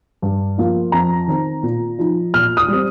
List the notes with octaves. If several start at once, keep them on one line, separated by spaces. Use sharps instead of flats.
G2
F3 A#3 F4
F2 A#5
D#3 C4
A#2
F3 D#4
A#2 F6
D#6
G3 C4